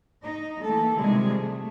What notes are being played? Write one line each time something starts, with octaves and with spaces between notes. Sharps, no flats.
D#4
E3 A3 A#3 A4
C3 D#3 F3 G3 G#3 G#4
A3